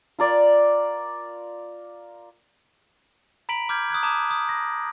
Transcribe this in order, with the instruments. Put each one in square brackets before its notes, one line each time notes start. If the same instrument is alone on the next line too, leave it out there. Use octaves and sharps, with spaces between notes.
[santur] F4 A#4 D5
[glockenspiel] A#5 B5 B6 D7 F#7
D6 F6 G6 G#6
D#6 F#6 G#6
A5 A#5 D6 D#6 G#6
D#6
A#6